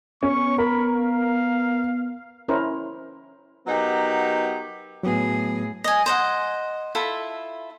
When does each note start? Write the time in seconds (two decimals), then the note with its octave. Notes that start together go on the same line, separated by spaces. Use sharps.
0.23 B3 C#4 C#6
0.58 A#4 B5
0.94 F5
2.48 C#4 E4 A#4 C5
3.67 F#3 B3 D#4 G4 A#4
5.03 A2 F#3 B3 G#4
5.84 D#5 G#5
6.06 C5 D#5 F#5
6.95 E4 F4 A4 E5